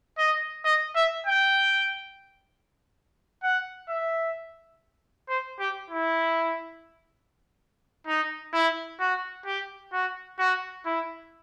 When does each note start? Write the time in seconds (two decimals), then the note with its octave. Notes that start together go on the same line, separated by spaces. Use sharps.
0.18 D#5
0.64 D#5
0.95 E5
1.26 G5
3.43 F#5
3.89 E5
5.29 C5
5.59 G4
5.90 E4
8.07 D#4
8.54 E4
9.00 F#4
9.46 G4
9.93 F#4
10.39 F#4
10.86 E4